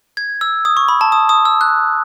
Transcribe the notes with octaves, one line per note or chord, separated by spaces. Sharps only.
G#6
E6
D#6
C#6
B5
A5
D#6
D#6
E6
F#6